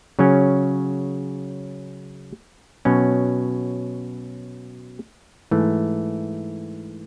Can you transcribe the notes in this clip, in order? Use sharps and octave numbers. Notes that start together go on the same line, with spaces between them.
C#3 F#3 C#4
B2 F#3 C#4
G#2 E3 A3